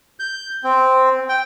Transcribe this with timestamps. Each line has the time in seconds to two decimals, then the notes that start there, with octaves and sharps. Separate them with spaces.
0.20 G6
0.64 C4
1.29 G5